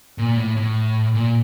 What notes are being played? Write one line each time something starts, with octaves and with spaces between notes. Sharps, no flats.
A#2
A2
A2
A#2